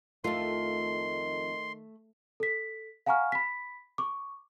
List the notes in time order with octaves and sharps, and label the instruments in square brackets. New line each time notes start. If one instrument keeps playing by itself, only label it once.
[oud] F2 F4 [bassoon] D#3 [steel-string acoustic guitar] A3 [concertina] C6
[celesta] A4 B6
F5 F#5 G#5 A#5 C#6 F6
B5 B6
C#6 D6